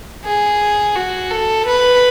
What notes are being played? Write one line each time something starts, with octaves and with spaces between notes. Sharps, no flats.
G#4
F#4
A4
B4